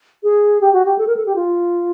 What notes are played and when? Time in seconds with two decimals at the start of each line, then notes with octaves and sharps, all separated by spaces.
0.23 G#4
0.61 G4
0.73 F#4
0.85 G4
0.98 A4
1.07 A#4
1.16 A4
1.26 G4
1.36 F4